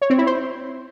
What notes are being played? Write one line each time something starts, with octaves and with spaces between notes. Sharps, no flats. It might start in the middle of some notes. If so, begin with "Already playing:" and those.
C#5
C4
E4
C5